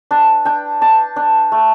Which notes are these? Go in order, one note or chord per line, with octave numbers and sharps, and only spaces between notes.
D4 A5
D4 G5
D4 A5
D4
A3